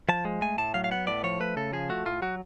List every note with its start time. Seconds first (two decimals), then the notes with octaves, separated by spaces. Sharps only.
0.09 F3 A5
0.25 G#3
0.42 A3 G#5
0.58 A2 A5
0.74 F#3 F5
0.84 F5
0.91 B3 F#5
1.07 A2 D5
1.24 F3 C#5
1.40 A3 B4
1.57 C#3 A4
1.73 F3 G#4
1.89 A3 F#4
2.06 A2 F4
2.22 F#3 F#4